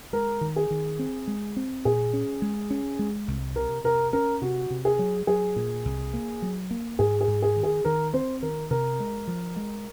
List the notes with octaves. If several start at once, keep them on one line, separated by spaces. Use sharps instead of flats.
G#3 A#4
D#3
G#4
D#3
C4
G#3
C4
A#2 G#4
C#4
G#3
C#4
G#3
C2
C3 A#4
C3 A#4
C#4 A#4
C3 F#4
C3
G#4
F#3
F#3 G#4
A#2
C2
A#3
F#3
A#3
G#2 G#4
G#4
G#2
G#4
D#3
G#4
D#3 A#4
C4 C5
D#3 A#4
C3 A#4
G#3
F3
G#3